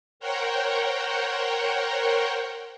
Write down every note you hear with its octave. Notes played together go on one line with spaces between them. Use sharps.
A#4 C5 C#5 F#5 G5